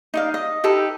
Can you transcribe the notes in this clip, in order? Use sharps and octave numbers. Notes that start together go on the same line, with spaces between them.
D#4 D5 F5
D#5
D#4 G4 A4 B4